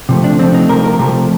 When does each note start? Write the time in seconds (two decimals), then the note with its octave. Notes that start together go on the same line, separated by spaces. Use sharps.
0.09 C3 F3 A3
0.24 D4
0.39 C3 F3 A3 C4
0.54 D#4
0.69 C3 F3 A3 A#4
0.85 A#4
0.99 C3 F3 A3